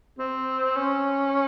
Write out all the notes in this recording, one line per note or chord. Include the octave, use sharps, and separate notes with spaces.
C4
C#4